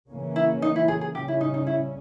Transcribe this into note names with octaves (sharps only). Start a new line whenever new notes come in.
C#3 E3 A#3 C#4
E4
D#4
E4
G#4
G#4
C#3 G3 C#4 G4
E4
D#4
D#4
E4